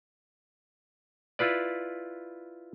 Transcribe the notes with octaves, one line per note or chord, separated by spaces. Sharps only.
E4 F4 B4 D5